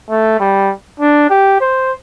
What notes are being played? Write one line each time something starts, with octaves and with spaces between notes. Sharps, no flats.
A3
G3
D4
G4
C5